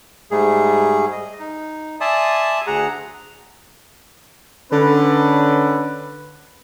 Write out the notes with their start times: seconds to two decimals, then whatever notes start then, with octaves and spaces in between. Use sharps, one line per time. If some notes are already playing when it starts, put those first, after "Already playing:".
0.31 G#2 G3 A3 G#4
1.12 D#5
1.40 D#4
2.01 D5 E5 G#5 A5 C6 D#6
2.67 D2 G#4 F#5 A#5
4.72 D3 C#4 B4